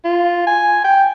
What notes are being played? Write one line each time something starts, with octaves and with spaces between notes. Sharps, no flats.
F4
G#5
G5